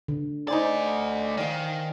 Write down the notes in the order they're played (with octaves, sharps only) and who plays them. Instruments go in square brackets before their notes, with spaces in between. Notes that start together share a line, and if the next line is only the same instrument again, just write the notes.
[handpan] D3
[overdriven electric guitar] A3 D5 [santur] D#4 C5 G#5
[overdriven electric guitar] D#3 [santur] D5 F5